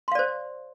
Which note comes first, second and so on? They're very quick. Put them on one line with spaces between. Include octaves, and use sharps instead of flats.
C6 F5 D5 C5